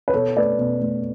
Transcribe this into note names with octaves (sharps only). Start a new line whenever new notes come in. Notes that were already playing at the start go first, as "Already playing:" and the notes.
B4
B2 A4 C#5
A3 B4 D5
B2
A3